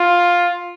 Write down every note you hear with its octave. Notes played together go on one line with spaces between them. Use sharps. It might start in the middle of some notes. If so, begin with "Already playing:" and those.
Already playing: F4